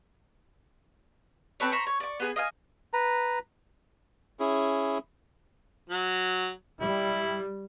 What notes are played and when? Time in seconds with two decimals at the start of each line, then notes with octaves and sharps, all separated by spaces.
1.60 C4 A4 B4 C#5
1.72 C5 A#5 B5 C#6
1.87 C#5
2.00 D5 C#6
2.20 B3 G#4 G#5
2.36 D#5 F5 G#5
2.93 B4 A#5
4.40 C#4 E4 G#4
5.90 F#3
6.80 G3 E4